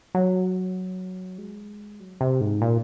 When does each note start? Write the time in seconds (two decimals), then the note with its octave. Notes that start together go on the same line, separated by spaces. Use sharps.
0.15 F#3
1.38 G#3
2.00 F#3
2.21 C3
2.41 G#2
2.62 A#2